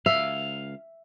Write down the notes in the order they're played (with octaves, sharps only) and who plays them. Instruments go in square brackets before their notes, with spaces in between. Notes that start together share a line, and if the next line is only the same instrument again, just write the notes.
[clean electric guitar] C#2 F5 [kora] E5